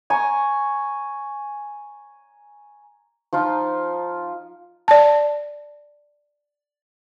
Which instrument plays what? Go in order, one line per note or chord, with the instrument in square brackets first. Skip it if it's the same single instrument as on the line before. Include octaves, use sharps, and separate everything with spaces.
[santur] G#5 A#5 C#6
F3 D#4 F4
[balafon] D5 A5